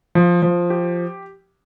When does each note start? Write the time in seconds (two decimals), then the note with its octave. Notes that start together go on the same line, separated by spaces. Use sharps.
0.15 F3
0.42 F3
0.70 G4